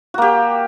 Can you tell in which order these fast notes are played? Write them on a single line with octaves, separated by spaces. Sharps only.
F#4 A#3 G4